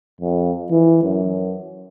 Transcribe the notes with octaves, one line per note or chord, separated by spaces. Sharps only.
F2
E3
F#2